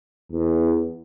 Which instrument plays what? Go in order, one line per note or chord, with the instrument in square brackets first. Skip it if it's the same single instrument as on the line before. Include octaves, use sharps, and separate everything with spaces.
[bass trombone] E2